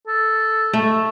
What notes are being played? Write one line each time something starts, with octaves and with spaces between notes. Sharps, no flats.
A4
A3